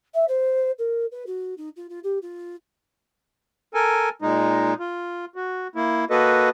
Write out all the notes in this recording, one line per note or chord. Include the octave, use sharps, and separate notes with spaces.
E5
C5
A#4
B4
F#4
D#4
F4
F4
G4
F4
A4 A#4 G#5
A#2 G#3 D#4
F4
F#4
A#3 E4
A#3 F#4 A4 B4 D#5